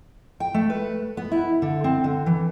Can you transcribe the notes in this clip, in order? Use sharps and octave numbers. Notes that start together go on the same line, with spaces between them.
G5
A3
B4
B3
E4
D3
C4
D3
E3